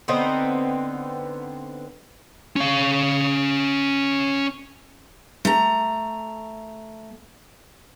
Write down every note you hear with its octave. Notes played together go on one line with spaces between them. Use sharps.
D3 B3 C4 D#4
C#4 F5
A3 A#5